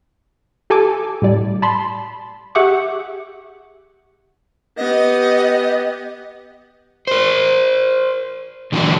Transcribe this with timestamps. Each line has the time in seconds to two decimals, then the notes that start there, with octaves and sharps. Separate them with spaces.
0.70 G4 A4 G#5 A5 D6
1.22 A2 G3 D5
1.62 A5 B5 C6
2.55 G4 G#4 E5 F#5 C#6 D6
4.77 B3 G4 D#5
7.07 A#4 C5
8.72 A#2 D3 E3 F#3 D4